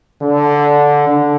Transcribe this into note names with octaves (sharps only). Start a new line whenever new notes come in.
D3
D3